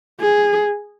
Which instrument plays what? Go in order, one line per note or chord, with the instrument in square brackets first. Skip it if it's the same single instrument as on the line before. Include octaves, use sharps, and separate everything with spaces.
[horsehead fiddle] G#4